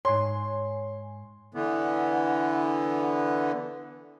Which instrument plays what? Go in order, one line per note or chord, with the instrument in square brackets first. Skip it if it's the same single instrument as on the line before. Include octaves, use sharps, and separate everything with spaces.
[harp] G#2 C7 [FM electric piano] C#5 G#5 [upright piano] C6
[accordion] D3 E3 B3